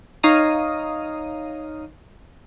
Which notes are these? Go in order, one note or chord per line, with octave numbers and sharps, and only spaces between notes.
D#4 C#5 F5 A#5 D#6